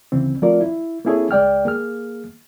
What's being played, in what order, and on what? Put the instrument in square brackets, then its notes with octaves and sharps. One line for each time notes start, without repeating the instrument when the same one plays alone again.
[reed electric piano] D2 C#3 E3 C4
F3 A3 C4 F4 A#4 D5
E4
A#3 C4 E4 G#4 A4 C#5
C#2 G#3 D5 G5 F6
A#3 G#4 F6